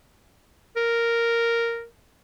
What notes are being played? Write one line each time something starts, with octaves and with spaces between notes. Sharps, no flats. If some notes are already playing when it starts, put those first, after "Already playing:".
A#4